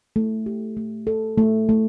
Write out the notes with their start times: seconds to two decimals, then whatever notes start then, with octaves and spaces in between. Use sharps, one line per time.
0.16 A3
0.46 G4
0.77 A3
1.07 A4
1.38 A3
1.69 A3